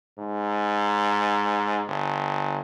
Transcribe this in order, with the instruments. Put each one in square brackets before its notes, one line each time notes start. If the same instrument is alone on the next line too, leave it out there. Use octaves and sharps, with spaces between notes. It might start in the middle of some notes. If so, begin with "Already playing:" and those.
[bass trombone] G#2
G1